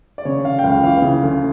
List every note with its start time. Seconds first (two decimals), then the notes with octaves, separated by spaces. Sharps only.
0.18 D5
0.25 C#3 C#5
0.44 C#3 F5
0.59 G5
0.64 C#2 F5
0.84 E3 F5
1.02 C#3
1.22 D2